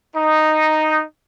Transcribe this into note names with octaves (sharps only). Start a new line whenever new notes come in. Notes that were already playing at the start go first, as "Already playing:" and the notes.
D#4